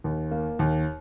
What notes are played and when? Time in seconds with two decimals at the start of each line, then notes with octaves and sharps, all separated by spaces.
0.04 D#2
0.31 A#3
0.59 D#2